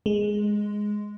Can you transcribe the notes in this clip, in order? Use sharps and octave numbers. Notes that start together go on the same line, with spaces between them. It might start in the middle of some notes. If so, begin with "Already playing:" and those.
G#3